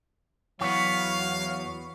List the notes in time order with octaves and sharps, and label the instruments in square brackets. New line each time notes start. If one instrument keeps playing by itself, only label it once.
[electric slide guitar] E2 E3 [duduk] F#3 [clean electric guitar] B3 F#4 [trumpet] F5